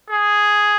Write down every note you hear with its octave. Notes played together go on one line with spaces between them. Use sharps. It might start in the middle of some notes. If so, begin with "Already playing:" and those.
G#4